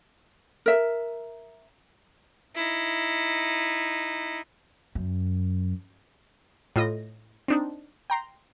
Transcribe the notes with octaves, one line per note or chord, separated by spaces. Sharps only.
A#4 E5
D#4 E4
F#2
A2 F4 D#5 A#6
C4 D4 D#4
G5 A#5 C6